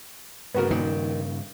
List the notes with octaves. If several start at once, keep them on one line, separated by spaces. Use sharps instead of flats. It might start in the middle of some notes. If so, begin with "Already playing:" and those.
G2 C#3 B3 F#4 A#4
A#2 D#3